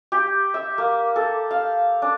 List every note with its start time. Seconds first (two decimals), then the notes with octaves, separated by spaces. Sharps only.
0.12 G4
0.54 E5
0.78 A#3
1.16 A4
1.51 F5
2.02 D4